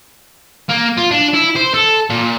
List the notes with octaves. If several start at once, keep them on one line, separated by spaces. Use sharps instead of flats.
A#3
F4
D4
E4
C5
A4
A#2